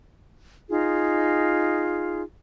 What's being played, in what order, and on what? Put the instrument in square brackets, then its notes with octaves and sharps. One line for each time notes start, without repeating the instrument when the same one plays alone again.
[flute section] D#4 F4 G#4